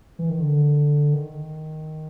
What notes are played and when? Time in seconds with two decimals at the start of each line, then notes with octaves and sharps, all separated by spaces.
0.19 E3
0.29 D#3
0.40 D3
1.13 D#3